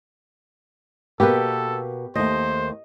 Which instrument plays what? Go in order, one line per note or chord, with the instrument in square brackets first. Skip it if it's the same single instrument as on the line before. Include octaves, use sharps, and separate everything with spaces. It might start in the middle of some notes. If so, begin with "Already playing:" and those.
[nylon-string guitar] B2 A#3 B3 [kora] G4 B4 [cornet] A4
[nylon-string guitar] D#2 A3 [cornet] C5 [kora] D#5